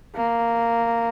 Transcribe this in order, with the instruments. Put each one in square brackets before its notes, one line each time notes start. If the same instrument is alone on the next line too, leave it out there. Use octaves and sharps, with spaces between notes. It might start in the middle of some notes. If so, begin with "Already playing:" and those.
[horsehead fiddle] A#3